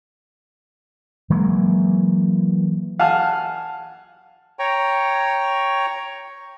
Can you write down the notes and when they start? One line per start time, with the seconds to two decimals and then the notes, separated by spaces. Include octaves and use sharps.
1.30 E3 F#3 G#3 A#3
2.99 F5 F#5 G#5 A5 F6
4.59 C#5 G5 A#5 C#6